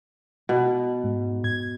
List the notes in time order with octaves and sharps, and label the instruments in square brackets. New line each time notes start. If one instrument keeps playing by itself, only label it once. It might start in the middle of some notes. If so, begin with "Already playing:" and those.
[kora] B2
[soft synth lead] G#2
G#6